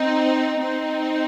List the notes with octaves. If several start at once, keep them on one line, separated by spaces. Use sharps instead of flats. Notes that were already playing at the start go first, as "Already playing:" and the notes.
Already playing: C4 D#4
C4 D#4